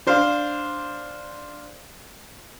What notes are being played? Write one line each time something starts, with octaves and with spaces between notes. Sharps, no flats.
D4 C5 F5